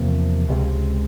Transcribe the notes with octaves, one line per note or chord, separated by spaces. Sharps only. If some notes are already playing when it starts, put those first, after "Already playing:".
Already playing: E2 C3 F3 A#3
C#2 C3 F3 G#3